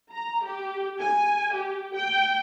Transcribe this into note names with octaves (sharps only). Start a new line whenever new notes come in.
A#5
G4
G#5
G4
G5